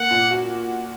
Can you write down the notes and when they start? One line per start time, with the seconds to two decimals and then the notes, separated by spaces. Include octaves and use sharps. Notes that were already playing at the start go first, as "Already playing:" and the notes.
Already playing: A#3 F#5
0.11 A#2
0.31 F#4